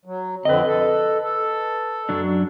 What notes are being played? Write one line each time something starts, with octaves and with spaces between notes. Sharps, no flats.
F#3
F2 D3 C4 B4 D#5
A4
A4
F#2 F#3 D4